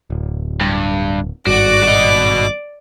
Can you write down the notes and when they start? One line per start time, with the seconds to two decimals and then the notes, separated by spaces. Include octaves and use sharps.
0.10 D1
0.61 G2
1.47 G#1 G2 F#4 D5 D6
1.83 F#4 D#5